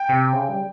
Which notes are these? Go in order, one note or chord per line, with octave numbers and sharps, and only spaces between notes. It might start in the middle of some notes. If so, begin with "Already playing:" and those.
Already playing: G5
C3
C#3
G3